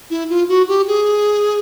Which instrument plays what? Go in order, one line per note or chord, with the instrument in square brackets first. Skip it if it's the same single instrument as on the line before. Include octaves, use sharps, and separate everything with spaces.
[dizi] E4
F4
F#4
G4
G#4